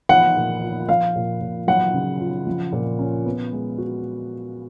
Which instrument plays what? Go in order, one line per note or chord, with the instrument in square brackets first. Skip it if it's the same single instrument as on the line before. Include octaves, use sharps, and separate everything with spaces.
[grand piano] F3 [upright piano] F#5
[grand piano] A#2
F4
[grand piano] F3 [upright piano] F5
[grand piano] A#2
A#2
[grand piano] F#3 [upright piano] F#5
[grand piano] C#3
F4
F3
A#2
C#4
B3
G#3
F#4